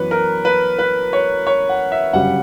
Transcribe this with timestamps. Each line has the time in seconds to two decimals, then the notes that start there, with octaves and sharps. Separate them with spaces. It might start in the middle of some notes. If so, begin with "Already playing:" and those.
Already playing: F#2 E3 B3 B4 C#5
0.11 A#4
0.45 B4
0.79 B4
1.13 C#5
1.47 C#5
1.69 F#5
1.92 E5
2.13 G1 F#2 C#3 G3 F#5